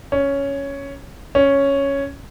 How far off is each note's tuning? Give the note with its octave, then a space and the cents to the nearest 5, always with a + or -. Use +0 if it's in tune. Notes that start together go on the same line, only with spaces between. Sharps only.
C#4 +5
C#4 +0